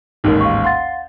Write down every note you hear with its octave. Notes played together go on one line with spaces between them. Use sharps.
A1 D#2 G#2 D#4 A#4
F5 C#6
F5 F#5 C6 A6